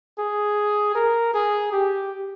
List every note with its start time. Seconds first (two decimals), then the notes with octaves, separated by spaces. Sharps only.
0.19 G#4
0.95 A#4
1.34 G#4
1.72 G4